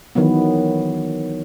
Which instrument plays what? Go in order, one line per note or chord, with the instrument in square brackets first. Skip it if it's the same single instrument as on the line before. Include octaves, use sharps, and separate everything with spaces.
[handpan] D#3 E3 F#3 B3